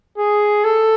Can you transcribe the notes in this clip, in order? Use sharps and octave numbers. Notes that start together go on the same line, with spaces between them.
G#4
A4